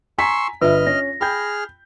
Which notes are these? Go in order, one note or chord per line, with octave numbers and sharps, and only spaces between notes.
G#5 A#5 C6 C#6 E6 B6
G1 F4 B4 D#5 E5 F6
C#4 A#6
G#4 G5 B5 F6 G6